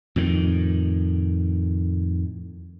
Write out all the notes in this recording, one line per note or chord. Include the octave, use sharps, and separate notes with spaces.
F2 A2 D#3